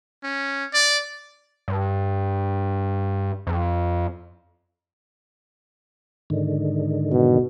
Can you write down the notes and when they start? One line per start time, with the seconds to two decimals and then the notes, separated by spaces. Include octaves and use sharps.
0.23 C#4
0.73 D5
1.68 G2
3.47 F2
6.30 G#2 D3 D#3
7.11 B2